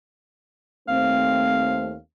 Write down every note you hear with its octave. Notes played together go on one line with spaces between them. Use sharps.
D#2 A3 C4 F5